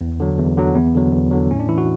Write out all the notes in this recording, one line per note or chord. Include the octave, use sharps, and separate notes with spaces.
E2
D3 F#3
E2
D3 F#3
E2 B3
D3 F#3
E2
D3 F#3
A2 C#4
D4
E3 E4
F#4